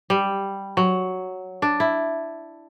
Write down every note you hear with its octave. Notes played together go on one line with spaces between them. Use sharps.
G3
F#3
D4
E4